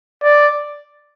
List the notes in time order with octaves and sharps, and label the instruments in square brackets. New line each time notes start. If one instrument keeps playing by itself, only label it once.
[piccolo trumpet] D5